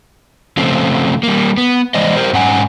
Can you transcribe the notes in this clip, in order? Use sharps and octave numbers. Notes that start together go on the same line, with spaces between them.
C#3 F3 A3 C4
G3 A#3
B3
E3 G#3 C5 D5 D#5
G4 A#4 C5
G#2 C#4 F#5 G#5